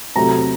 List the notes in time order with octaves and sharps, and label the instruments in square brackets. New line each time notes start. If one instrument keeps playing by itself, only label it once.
[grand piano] C3 F#3 A3 A#5